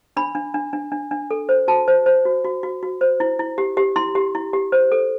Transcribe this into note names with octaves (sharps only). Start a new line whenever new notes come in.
D4 B5
D4
D4
D4
D4
D4
A4
C5
F#4 A5
C5
C5
F#4
F#4
F#4
F#4
C5
E4
E4
G4
G4
E4 C6
G4
E4
G4
C5
A4